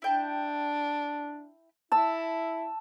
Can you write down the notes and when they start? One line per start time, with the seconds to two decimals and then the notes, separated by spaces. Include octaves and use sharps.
0.02 D4 E4 G5 A5
1.92 E4 A5 E6